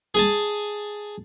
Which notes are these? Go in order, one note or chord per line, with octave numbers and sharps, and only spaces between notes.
G#4 G#5 A5